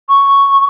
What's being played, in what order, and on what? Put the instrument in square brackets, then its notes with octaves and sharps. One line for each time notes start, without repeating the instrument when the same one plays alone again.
[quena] C#6